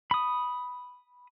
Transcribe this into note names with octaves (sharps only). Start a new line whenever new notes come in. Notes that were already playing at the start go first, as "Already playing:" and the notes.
B5 D#6